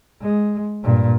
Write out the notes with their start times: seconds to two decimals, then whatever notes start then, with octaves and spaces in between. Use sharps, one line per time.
0.21 G#3
0.83 G2 A#2